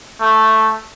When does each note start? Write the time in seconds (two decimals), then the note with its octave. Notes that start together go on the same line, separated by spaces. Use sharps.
0.21 A3